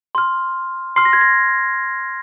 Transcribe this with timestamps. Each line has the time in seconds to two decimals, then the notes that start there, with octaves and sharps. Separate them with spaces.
0.15 C6 F6
0.96 C6 F6 C7
1.05 A#6
1.13 G#6
1.21 A#6